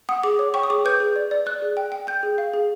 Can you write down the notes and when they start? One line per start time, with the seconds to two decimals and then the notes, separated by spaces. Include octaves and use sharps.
0.09 F#5 D#6
0.24 G#4 D6
0.39 C#5
0.54 G5 C#6
0.63 D#6
0.70 G#4 D6
0.85 B4 G6
1.00 G#4
1.16 D5
1.31 D5
1.46 D5 F#6
1.62 G#4
1.77 G5
1.92 G5
2.07 G5 G6
2.23 G#4
2.38 F5
2.54 G#4